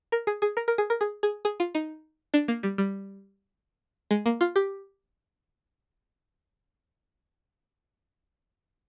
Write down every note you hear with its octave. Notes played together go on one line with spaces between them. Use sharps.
A#4
G#4
G#4
A#4
A#4
G#4
A#4
G#4
G#4
G#4
F4
D#4
D4
A#3
G3
G3
G#3
A#3
F4
G4